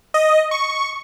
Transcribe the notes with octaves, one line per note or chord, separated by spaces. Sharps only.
D#5
C#6